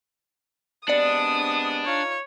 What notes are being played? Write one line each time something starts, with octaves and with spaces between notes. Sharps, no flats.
C3 G#3 B3 D4 D5 D#6 C#7 F#7
D#4 F4 C#5